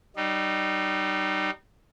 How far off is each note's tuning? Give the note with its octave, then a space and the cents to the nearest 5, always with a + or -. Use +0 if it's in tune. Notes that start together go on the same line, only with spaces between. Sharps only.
G3 -25 D#4 -30